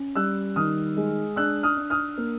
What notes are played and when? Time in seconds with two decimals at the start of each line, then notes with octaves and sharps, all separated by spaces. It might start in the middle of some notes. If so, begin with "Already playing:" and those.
Already playing: C#4
0.16 G3 E6 F#6
0.56 D#3 D#6 F6
0.97 G#3
1.36 D4 E6 F#6
1.63 D#6 F6
1.77 D4
1.90 D#6 F6
2.17 A#3